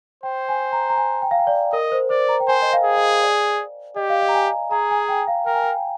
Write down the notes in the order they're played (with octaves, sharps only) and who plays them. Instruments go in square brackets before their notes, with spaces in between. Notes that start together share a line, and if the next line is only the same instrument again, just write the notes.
[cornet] C5 [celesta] G5
[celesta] G#5
A#5
A#5
G#5
G5
F5
G5
D5
[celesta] A#4 [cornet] D#5
[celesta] C5
[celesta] C5 [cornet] D5
[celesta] A#5
G5
[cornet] C5 [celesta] G#5
[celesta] D#5
F5
[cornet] G#4
[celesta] D#5
D5
[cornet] G4 [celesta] D#5
[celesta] F5
D#5
A#5
G#5
[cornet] G#4 [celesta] A#5
[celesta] G#5
G5
F5
[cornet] A#4 [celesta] G5
[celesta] G#5
G5